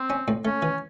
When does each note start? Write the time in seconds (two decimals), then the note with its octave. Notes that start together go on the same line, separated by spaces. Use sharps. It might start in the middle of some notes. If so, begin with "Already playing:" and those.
Already playing: C4
0.10 C#4
0.28 A2
0.45 A3 C#4
0.62 E3